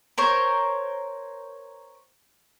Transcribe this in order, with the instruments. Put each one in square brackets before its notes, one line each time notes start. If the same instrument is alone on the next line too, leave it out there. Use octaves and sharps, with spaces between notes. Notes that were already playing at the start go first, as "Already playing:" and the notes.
[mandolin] A#4 C5 C#5